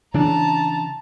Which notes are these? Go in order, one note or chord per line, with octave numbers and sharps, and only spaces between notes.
C#3 E3 D4 A5 A#5